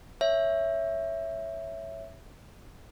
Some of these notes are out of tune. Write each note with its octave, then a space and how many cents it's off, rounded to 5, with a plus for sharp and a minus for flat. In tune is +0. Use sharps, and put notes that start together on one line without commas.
C#5 +0 E5 +0